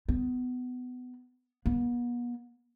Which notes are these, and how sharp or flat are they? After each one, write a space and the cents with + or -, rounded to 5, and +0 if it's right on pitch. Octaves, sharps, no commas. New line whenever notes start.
B3 +20
B3 -40